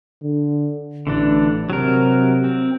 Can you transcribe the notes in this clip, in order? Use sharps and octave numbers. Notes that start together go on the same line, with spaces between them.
D3
A1 D3 E3 D4
C3 F#3 A#4
C4